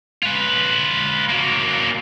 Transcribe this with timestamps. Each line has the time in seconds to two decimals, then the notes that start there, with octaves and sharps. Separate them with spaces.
0.23 F4 B4
1.29 F#3 A#3